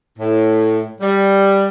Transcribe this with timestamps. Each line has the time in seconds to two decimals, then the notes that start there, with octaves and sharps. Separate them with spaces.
0.18 A2
1.01 G3